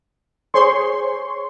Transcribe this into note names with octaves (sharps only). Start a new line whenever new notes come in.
G#4 C5 C#5 C6 C#6